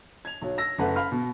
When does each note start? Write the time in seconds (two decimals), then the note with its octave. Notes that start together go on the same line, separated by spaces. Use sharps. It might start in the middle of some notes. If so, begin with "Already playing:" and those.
0.25 G#6 F7
0.42 B1 F#3
0.58 E6 A#6
0.78 F#1 A3 B4 F#5
0.96 F5 B5 F6
1.12 B2